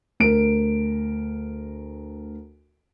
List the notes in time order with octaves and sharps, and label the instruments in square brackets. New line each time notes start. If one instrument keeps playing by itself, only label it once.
[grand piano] D2 A#4 D7